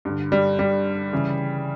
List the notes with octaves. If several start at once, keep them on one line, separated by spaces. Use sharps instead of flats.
G2 D3
G3
G3
C#3 E3